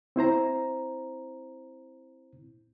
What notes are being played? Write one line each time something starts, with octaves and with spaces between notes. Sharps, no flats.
C4 E4 C5 A#5